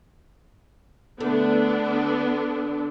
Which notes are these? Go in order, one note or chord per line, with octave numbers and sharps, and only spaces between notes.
D3 A3 B3 D4